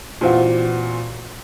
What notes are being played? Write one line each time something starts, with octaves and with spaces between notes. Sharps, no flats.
A#2 E3 C4 F4 F#4